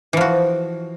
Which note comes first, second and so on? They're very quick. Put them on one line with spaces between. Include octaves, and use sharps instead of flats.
E3 F3 F#4